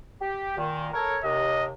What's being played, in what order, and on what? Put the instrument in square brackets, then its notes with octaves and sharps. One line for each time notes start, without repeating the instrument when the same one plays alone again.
[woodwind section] G4
A#2 D#3
A4 A#4 C#5
[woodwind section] D#2 C3 [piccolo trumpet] D#5